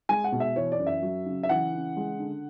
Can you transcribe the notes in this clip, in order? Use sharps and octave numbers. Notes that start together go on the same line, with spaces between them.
G#3 G#5
F#5
B2
E5
E3 C#5
D5
F#2
E5
F#3
C#3
E5
E3 F#5
C#3
G#3
D3